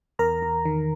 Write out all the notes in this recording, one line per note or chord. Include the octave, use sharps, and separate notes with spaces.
E2 A#4 A#5
E2
D#3